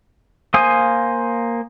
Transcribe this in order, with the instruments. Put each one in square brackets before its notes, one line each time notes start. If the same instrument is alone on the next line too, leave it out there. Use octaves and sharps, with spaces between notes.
[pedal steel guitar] A#3 C5 F5 G#5 D#6